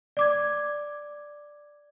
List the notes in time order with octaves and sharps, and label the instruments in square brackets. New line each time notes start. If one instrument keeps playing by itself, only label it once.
[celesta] D5 D6 G#6